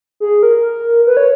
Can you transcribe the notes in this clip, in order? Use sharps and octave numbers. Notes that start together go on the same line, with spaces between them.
G#4
A#4
B4
C#5